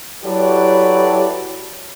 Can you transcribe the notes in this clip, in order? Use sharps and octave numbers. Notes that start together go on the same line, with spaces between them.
F#3 E4 G4 A4 B4 D5